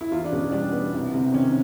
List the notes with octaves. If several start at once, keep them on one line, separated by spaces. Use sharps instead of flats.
E4
E2 F4
D4
B2 C#4
G3 D4
B3
C2
C3
D#3 C#4